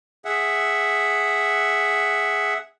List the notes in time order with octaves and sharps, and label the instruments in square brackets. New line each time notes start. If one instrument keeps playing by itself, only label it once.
[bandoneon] G#4 E5 F#5